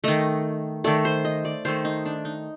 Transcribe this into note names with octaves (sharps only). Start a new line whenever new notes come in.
D#3 A3 D#5
D#3 A3 D5
C5
D#5
D5
D#3 A3 C5
D#4
D4
D#4